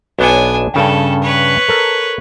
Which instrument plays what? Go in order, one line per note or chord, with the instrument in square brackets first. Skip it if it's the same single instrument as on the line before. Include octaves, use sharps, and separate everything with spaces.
[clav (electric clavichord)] B1 B3 C#5 [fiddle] D4 G#5
[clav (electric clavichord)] G2 C#3 G5 [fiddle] C#4 A4
[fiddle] B4 C#5
[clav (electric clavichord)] A4 A#4